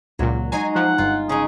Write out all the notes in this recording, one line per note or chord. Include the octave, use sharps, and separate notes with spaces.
C#2 A#2 F#3
F#3 G#3 D#4 G#5
F3 F#5
G1 F4
C#3 D#4 G#4